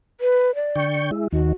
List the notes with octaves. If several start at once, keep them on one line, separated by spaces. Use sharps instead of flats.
B4
D5
D3 G5 C#6
G#3 E4
D#2 D#3 F#4